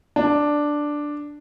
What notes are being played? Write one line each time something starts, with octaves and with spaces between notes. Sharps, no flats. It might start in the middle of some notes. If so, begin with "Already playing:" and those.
D4